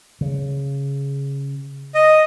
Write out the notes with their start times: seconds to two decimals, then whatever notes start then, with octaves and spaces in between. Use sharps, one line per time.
0.21 C#3
1.95 D#5